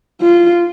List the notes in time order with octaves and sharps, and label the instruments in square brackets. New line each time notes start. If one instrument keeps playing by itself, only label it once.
[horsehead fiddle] F4